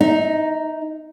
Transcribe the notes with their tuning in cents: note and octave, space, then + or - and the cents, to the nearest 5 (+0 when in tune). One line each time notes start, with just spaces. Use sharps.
D#4 +0 E5 -35